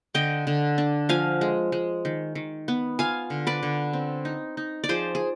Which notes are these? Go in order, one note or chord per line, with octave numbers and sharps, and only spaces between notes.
D3 D#5 G5
D3
D4
F3 F5 G#5
G#3
G#3
D#3
D#3
B3
F4 F5 G#5
D3
B4 D5
D3
C4
D#4
D#4
D5
F3 G#4 C5
G#4